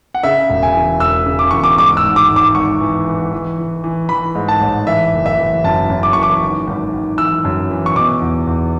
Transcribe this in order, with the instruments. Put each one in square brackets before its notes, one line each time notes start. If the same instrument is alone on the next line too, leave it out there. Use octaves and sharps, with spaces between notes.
[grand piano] F#5
C#3 E5
E1
G#5
E3
E1 E6
C#3
D6
E2 C#6
D6
G#2 D6
E6
G#1
D6
G#1
D6
G#1 C#6
E3
E3
E3
E3
E3
E3 B5
G#2
A5
A1
E3 E5
F#1
E5
E3
F#2 A5
F#2
D6
E3 C#6
D6
G#1
G#1
G#1
E3 E6
F#2
E3
C#6
B2 D6
E2
E2